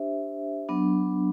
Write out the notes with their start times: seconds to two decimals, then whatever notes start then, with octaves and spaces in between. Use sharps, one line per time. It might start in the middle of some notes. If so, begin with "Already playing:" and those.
Already playing: D4 G4 C5 E5
0.69 F#3 B3 D4